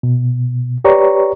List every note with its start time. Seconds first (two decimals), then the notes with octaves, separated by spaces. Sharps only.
0.03 B2
0.84 G4 B4 C#5 D5 A#5 C#6